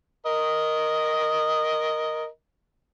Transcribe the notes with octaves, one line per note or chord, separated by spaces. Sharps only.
A#4 D#5